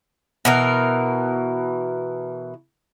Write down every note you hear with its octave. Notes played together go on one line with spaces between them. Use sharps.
B2 E3 A#4